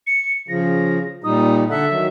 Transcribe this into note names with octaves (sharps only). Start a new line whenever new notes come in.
C#7
C#3 F3 A#6
A#2 G3 D#4 D#6
D3 A4 E5 F#5
D#3 F#3